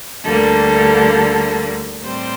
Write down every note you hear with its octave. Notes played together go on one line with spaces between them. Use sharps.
D2 D3 G3 A#3 A4
A2 G3 C4 C5